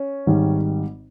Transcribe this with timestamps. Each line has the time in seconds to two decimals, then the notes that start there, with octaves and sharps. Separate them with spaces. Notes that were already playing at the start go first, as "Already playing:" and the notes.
Already playing: C#4
0.26 G#1 G#2 D#3 G3